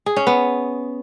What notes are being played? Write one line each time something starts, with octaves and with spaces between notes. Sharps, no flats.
G#4
C#4
B3